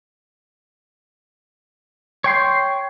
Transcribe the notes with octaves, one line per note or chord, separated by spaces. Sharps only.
C#5 G5 C6